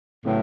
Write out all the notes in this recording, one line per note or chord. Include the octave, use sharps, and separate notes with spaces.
A2 C#3 F#3 B3